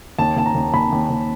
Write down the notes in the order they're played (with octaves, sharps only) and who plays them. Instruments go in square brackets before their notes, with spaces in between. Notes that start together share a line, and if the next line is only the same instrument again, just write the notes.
[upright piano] D#2 A5
D#2 A5
A#5
D#2
D#2 B5
D#2
D#2